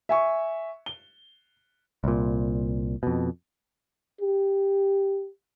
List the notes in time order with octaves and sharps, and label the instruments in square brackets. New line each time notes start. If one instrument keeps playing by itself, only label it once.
[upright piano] E5 G#5 C#6
G7
[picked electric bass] C2 A#2
F2 B2
[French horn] G4